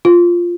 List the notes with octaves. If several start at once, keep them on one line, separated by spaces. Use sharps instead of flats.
F4